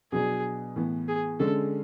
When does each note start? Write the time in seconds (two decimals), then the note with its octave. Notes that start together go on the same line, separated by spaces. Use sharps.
0.12 B2 F#3 B3 D4 G#4
0.76 A2 E3 B3
1.08 G#4
1.40 D3 G#3 C#4 A4